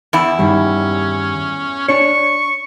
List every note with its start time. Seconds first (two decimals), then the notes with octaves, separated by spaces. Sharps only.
0.13 E2 E4
0.39 G2 D#3 G3 C#4
1.89 D4 C#5 C#6